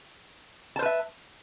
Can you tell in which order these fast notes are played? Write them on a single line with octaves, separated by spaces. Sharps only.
A5 C5 B4 E5